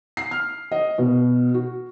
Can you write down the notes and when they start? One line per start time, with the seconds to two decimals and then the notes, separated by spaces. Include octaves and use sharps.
0.17 C7
0.31 F6
0.71 D#5
0.98 B2
1.54 F#4